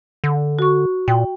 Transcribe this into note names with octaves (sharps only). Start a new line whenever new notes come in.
D3
F#4 C#6
A#2 G5